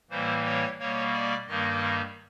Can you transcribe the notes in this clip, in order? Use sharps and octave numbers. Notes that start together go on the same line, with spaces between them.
A2 E3 G3 A#3 C5
C#5
B2 G3 A#3 C#5
D5
G2 D#3 G3 A#3 D#5